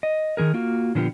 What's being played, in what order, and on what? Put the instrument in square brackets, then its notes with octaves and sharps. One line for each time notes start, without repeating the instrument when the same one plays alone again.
[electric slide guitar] D#5
D#3 E3 G#4 A#4
A#3 F4 F#4
A#2 D3 F3 B3 F4 G4